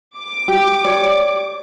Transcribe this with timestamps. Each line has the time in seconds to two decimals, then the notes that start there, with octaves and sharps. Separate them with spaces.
0.18 D6
0.48 G4
0.85 C#5 D5